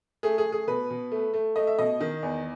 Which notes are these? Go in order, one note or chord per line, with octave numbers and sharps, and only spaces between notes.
A3 G#4
G#4
A3
G#4
B2 B4
B2
A3
A3
A3 D#5
E5
B2 D#5
D#3
E2